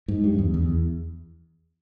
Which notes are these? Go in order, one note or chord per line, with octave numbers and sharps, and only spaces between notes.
G#2
G2
G2
E2
E2
E2